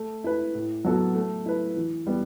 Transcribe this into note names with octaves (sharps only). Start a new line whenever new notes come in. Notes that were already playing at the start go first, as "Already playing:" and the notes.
Already playing: A3
E4 B4
A2
F#3 B3 F#4 A4
A3
E4 B4
E3
G3 B3